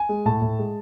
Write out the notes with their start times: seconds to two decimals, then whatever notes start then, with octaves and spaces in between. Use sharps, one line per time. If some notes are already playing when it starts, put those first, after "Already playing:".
Already playing: G#5
0.09 G#3
0.25 A2 A5
0.42 A2
0.59 G#3